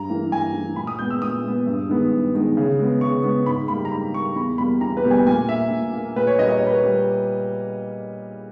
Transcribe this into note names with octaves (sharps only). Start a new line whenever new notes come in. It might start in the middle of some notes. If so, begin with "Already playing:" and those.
Already playing: G2 A#5
E3 A#3
G2 G#5
E3 A#3
A#2 B5
D#6
G#3 B3 G6
E6
A#2 D#6
G#3 B3
G2
D#3 G#3 B3
G2
D#3 G#3 B3
C#3
G#3 B3
C#3 C#6
G#3 B3
G#2 B5
G3 A#3 B5
A#5
G#2 B5
G3 A#3 C#6
E2 B5
B2 G3 A#3 B5
E2 A#5
B4
B2 G3 A#3
G#5
A#2 G#5
A#3 E5
A#2
A#3
A#2 B4
C#5
G3 A#3 D#5
D#5
C#5
A#2
B4
C#5
G3 A#3